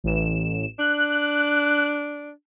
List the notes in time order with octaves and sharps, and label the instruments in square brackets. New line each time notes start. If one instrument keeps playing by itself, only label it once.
[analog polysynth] A1 E7
[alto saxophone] D4 [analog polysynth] F#6